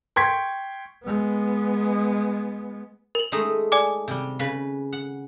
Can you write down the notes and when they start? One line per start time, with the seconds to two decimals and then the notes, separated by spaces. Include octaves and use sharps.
0.16 G5 C6 C#6 G#6 B6
1.04 G#3 B3
3.15 A#4 F#7
3.32 G#3 A3 D#4
3.72 D5 G#5 D6
4.08 C3 G3
4.39 C#3 B4
4.93 F#5